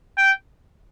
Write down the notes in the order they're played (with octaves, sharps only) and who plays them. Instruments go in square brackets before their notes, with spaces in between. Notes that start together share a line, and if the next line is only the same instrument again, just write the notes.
[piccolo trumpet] G5